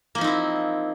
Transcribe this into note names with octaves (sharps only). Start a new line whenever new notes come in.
F3 A#3 C4 D#4 E4